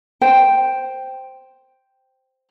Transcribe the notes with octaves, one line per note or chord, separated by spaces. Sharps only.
C5 G5